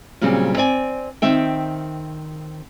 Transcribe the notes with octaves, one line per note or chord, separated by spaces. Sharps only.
A#2 C#3 F#3 G3 C4
C4 D5 G#5
D#3 C4 E5 G5